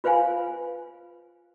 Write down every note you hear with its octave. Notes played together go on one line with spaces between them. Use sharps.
F4 B4 C5 F5 G#5